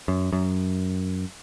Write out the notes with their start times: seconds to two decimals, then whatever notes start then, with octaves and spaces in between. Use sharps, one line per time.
0.08 F#2
0.33 F#2